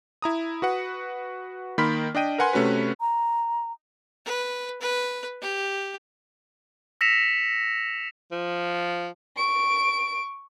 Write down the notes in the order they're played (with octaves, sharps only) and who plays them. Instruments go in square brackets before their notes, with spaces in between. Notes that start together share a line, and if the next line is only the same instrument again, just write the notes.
[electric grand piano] E4 A#5 D#6
F#4 B4 F#5
D#3 A#3 B5 C6 F6 B6
D4 D#5 G5 D#7
A#4 B4 F#5 G#5 C6
C3 A3 C#4 F#4 B4
[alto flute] A#5
[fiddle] B4
B4
G4
[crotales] E6 A#6 B6 C#7 E7 F7
[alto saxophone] F3
[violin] C#6 D7